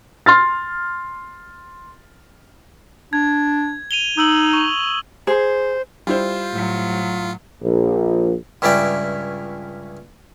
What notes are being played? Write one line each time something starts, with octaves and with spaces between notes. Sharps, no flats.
C6 F6 A6
D4 G#6
D#7 F7 G7
D#4 D#6 E6 F#7
C#6
G#4 C5
G3 E4 F4 C5
A2 F#3
A#1
C#2 G2 C#4 E4 D5 G5